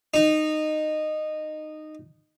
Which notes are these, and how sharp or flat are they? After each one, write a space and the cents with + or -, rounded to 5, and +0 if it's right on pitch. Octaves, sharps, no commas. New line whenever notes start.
D#4 -15